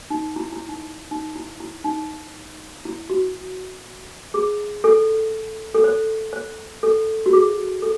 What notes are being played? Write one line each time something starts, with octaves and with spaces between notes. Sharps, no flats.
D#4
E4
E4
D#4
D#4
E4
E4
D#4
E4
F#4
G#4
A4
A4
C5
C5
A4
F#4
G#4
A4